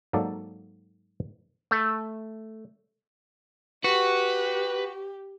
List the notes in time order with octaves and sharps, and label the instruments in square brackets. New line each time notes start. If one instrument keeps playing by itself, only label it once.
[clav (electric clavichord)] G#2 F#3 A#3 A4 D5
A3
[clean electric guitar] F#4 [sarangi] G4 [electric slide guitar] B4